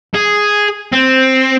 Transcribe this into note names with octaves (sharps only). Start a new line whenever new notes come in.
G#4
C4